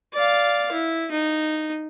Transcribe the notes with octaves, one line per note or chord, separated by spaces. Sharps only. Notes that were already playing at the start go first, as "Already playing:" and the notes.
D5 F5
E4
D#4